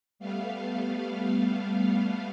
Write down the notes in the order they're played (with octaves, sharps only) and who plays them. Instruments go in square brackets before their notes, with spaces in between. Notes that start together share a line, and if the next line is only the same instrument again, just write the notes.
[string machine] G3 A3 B3 F5